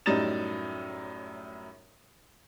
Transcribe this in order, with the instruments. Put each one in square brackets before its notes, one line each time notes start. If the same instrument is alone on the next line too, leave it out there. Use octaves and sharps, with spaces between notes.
[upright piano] F#2 A2 G3 D#4 A6 E7